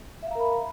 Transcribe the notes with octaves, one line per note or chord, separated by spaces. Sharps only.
A#4 E5 F5 A#5 B5